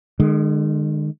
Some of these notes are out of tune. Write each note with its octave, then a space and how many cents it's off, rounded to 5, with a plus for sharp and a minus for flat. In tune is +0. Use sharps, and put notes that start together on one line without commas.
D#3 -45 G#3 +0